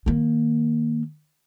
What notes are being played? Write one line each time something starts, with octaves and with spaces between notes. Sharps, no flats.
D#3 A#3